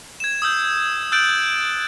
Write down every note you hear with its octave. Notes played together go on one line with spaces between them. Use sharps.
G#6 E7
D#6 E6 G6
E6 F#6 G6 A6 D7 F#7